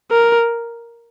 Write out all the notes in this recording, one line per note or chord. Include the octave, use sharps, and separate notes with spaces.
A#4